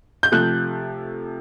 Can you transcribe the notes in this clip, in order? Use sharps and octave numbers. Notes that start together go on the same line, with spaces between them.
G6
C3 F3 A3 F#6